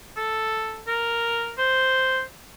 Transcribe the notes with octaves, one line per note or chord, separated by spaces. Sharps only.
A4
A#4
C5